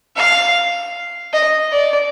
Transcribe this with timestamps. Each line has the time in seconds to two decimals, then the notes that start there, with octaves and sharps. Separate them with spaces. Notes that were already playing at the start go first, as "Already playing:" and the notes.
0.16 F5
1.33 D#5
1.72 D5